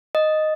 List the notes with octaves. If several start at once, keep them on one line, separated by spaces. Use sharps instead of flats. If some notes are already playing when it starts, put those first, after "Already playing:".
D#5